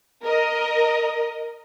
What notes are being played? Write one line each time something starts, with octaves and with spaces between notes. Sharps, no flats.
A#4 D#5